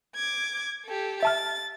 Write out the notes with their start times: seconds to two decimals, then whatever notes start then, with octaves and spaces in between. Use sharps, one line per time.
0.15 D6 G#6
0.85 G4 A4
1.23 E5 A5 F6 A6